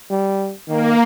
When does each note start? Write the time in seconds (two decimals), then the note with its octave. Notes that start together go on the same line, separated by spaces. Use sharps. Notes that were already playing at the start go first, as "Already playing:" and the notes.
0.10 G3
0.68 D#3 A#3